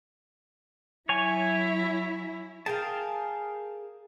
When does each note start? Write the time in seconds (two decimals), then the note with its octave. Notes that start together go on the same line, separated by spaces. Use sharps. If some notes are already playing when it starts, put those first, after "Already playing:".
1.09 F#3 E4 C#5 G#5
2.66 G#4 A#4 F5 G5 A5